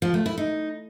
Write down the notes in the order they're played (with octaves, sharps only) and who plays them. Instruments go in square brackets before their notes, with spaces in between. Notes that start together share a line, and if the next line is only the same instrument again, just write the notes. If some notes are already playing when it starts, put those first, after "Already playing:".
[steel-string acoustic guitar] F3
A3
E4
D#4